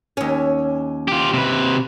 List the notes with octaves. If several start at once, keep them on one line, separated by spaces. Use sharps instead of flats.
D#2 C#4
F4 G4
C3 B4